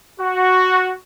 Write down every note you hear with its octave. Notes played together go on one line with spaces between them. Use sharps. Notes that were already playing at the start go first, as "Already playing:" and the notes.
F#4